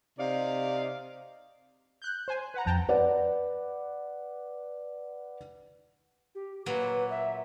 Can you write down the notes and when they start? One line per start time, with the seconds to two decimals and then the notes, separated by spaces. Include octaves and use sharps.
0.19 C3 D#4 D5 F5
2.02 F#6 G6
2.28 C5 G#5
2.54 B4 F#5 A#5
2.66 F2 G5 A5 A#5
2.89 B4 D5 F#5
6.35 G4
6.66 A#2 F#3 A#3 B4
7.10 E5